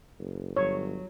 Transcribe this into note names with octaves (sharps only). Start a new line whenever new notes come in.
F#1
G1 F#3 C#5